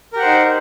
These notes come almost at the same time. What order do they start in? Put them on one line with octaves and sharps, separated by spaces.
A#4 G4 F#5 C5 D#4